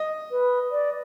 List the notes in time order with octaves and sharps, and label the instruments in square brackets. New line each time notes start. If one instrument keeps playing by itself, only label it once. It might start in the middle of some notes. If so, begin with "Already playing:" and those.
Already playing: [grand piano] D#5
[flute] B4
D5